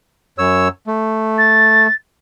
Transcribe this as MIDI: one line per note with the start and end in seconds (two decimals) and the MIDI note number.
0.38 0.68 42
0.38 0.68 73
0.38 0.68 88
0.87 1.87 57
1.38 1.93 93